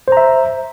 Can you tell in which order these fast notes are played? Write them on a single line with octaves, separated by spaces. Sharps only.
C5 A#5 E5